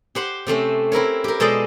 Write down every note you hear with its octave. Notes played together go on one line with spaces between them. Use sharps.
G4 C5 F#5 C6
C3 A3 C4 C#4
C4 E4 A#4 C#5
G4 A#4
B2 G#3 A4 C5 D5 D#5